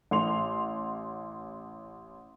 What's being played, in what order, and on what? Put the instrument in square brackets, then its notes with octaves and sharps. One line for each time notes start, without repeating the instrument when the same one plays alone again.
[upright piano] A1 C6 F7